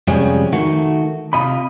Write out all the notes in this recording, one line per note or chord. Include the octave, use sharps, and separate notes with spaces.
F2 C3 F3 G3 G#3 C#4
D#3 A3 F#4
C3 F4 D#5 B5